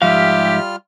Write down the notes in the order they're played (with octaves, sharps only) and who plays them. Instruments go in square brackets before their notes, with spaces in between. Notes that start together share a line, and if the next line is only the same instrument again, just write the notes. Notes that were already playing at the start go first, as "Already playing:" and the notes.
[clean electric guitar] G#2 F3 F5 [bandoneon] G3 F4 F6 [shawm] G4 [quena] E5